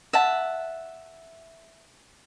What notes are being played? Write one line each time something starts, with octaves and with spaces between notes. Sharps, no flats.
E5 F#5 A5